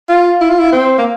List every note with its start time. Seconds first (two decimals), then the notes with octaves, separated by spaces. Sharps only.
0.09 F4
0.41 E4
0.49 F4
0.59 E4
0.72 C4
0.98 A#3